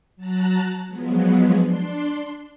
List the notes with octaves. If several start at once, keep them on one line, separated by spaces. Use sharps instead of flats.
F#3 A5 A#5 F#6
F3 F#3 G#3 B3
D4 C6